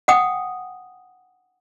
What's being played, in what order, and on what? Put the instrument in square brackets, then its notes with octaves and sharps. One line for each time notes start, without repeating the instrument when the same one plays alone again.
[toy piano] F#5 G5 D#6